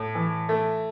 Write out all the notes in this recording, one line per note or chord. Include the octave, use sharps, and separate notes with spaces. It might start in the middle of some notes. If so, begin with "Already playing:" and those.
Already playing: A2
E3
A3